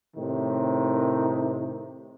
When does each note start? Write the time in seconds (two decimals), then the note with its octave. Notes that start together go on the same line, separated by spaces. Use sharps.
0.16 A2 C3 D#3